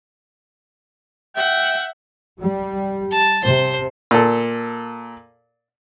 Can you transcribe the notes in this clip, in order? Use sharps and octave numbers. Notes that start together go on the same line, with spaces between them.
E5 F#5 G5
G3
A5
C3 C5
A#2 A4